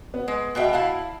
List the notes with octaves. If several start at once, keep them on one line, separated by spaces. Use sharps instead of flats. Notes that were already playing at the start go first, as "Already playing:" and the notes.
B3
G#3
B2 G#3 F#4 D#5 E5 G5
E4 F5 A5